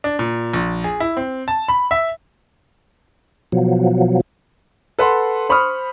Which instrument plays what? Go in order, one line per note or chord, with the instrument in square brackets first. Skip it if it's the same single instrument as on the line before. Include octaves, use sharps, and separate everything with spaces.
[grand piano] D4
A#2
A#1
G#4
E4
C4
A5
B5
E5
[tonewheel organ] B2 F3 F#3
[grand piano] A4 B4 F#5 C6
C5 B5 C#6 D#6 F6